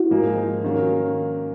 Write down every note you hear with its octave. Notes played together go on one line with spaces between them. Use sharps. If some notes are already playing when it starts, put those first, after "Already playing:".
Already playing: E4 F#4
G#2 F3 A#3 D#4 G#4
D#3 F#3 A#3 C#4